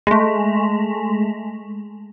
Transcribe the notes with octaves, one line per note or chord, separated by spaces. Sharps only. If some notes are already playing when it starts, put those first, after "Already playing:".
G#3 A3